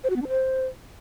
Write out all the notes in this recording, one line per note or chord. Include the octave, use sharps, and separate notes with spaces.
C5
F#4
B3
D4
C5